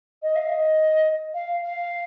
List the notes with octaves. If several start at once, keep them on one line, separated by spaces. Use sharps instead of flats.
D#5
F5
D#5
F5
F5